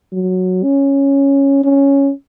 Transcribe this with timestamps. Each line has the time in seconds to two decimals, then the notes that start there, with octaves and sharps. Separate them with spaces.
0.13 F#3
0.63 C#4
1.64 C#4